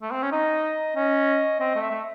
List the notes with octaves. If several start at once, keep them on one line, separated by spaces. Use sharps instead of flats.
A3
C4
C#4
D#4 D#5
C#4 D#5
C4 D#5
A3
E5
A3